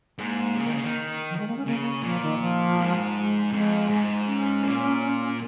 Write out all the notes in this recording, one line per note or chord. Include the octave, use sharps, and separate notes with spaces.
G#2 A#3
C#3
D#3
C#3
D#3
F3
G#3
A#3
C#4
C#3 A#3
A#3
A#2 F3
D#3
F3
G#2
G#3
F2 G#3
G#2
C#4
A#2